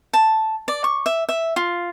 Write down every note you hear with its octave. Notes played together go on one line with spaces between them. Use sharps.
A5
D5
C#6
E5
E5
F4